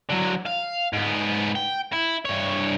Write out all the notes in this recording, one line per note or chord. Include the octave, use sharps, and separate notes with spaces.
D3 F#3
F5
G#2 B3
G5
E4
G2 C#5